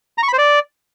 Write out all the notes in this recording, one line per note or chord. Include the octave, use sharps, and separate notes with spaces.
A#5
C#6
B5
C5
D5